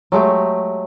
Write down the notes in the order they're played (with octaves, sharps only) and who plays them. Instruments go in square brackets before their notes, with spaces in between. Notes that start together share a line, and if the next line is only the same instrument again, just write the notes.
[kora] F#3 G#3 A3 G4